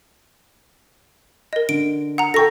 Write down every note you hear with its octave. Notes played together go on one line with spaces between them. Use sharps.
A#4 D#5
D3 D7
F#5 A#5
A4 G5 C#6 A#6